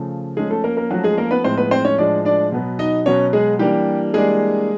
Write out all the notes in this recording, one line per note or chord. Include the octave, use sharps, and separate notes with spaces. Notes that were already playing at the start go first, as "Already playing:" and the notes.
Already playing: C#3 F3 A3
F3 G#3 A3 C#4 G#4
A3 A4
A#3 A#4
A#3 A#4
F3 F#3 A3 C#4 F#4
G#3 G#4
A#3 A#4
B3 B4
A2 F3 G#3 C4 C5
B3 B4
C4 C5
C#4 C#5
A2 F3 G#3 D4 D5
D4 D5
B2 F#3 B3
D#4 D#5
B2 F#3 B3 C#4 C#5
G#3 G#4
E3 G3 A#3 D4 G4
E3 G3 G#3 A#3 D4 G#4